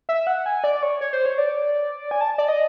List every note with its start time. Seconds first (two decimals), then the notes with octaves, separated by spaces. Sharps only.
0.09 E5
0.27 F#5
0.46 G#5
0.64 D5
0.83 C#5
1.01 C#5
1.13 C5
1.26 C#5
1.38 D5
2.11 G#5
2.21 A5
2.38 D5
2.48 D#5